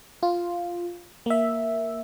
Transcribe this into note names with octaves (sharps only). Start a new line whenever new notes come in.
F4
A#3 E5